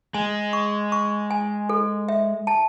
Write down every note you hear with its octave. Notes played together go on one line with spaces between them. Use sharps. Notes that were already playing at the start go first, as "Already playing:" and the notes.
G#3 G#5
C#6
C#6
G#5
A4
E5
A5